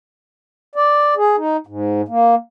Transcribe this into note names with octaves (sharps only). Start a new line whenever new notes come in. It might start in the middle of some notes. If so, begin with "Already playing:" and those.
D5
G#4
D#4
G#2
A#3